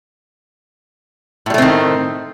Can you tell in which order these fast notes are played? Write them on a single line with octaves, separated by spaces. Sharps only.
A2 G3 A3 C4 D#3